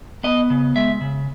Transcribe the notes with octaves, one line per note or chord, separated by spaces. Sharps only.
B3 D#5
C#3
G#3 E5
C#3